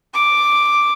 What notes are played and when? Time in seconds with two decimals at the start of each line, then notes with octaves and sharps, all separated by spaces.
0.14 D6